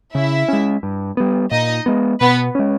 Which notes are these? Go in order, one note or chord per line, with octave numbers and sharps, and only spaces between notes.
C#3 E4 E5
G#3 C#4
G2
G3 B3
A#2 D#4 D#5
G#3 B3
B2 B3 B4
G#3 C#4